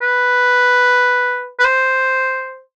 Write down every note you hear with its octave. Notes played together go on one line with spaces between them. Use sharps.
B4
B4
C5